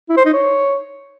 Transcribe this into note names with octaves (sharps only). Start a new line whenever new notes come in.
E4
C5
D#4
C#5